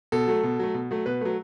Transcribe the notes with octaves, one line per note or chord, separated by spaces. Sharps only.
B2 A4
F#3 A3
B2
F#3 A3
B2
F#3 A3
B2 B4
F#3 A3